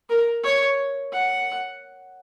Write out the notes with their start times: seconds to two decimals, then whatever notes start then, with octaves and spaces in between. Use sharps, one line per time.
0.09 A#4
0.43 C#5
1.12 F#5